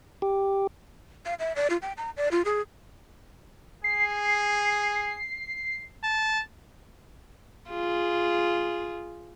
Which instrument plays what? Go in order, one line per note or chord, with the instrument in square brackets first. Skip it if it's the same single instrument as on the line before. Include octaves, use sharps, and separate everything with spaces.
[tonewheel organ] G4
[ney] F5
E5
D5
F4
G5
A#5
D5
F4
G#4
[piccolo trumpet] G#4 [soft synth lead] C7
[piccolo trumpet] A5
[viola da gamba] F4 G#4